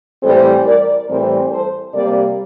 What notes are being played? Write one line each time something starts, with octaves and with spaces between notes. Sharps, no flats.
A2 E3 G3 C4 A4 C5
A#4 D5
A2 E3 G3 C4 A#4 D5
A4 C5
C3 G3 A#3 A#4 D5